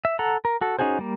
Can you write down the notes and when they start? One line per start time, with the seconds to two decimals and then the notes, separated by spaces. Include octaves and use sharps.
0.05 E5
0.19 A4 F#5 A#5
0.45 A#4
0.61 F#4 A4
0.79 C#4 D#4 F#4 G#4 C5
0.99 G3 A#3